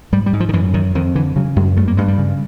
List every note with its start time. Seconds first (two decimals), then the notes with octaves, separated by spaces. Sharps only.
0.12 G#2 G3
0.26 G3
0.33 G#2
0.40 F3
0.49 D#3
0.53 F#2 E3
0.74 F#2 D#3
0.95 F2 D#3
1.15 D3 E3
1.36 C#3 F#3
1.56 F#2 G#3
1.77 G2 A3
1.88 A#3
1.97 G2 G#3
2.08 G3
2.18 C#3